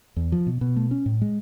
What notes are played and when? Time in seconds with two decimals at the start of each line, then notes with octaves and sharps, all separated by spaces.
0.16 E2
0.32 F3
0.47 B2
0.61 B2
0.76 A3
0.91 C#4
1.06 A2
1.21 G#3